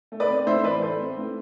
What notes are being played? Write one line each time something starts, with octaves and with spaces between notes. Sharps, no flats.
A3
B4 D5
C4
A2 C5 E5
E3 B4 D5
A3 A4 C5
C4
A2